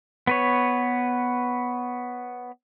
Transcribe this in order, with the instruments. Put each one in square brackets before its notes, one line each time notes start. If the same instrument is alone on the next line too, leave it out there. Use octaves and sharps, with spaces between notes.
[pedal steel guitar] B3 B4 C#5